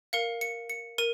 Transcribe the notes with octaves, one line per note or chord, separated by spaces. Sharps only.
A#4 F5 C#7
C#7
C#7
A#4 D#7